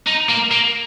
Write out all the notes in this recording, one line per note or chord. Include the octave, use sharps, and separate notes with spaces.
D#4
A#3
A#3